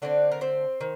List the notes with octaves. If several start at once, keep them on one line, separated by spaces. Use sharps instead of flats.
D3 A3 C4 D4 D5
A#4
C4 C5
D#3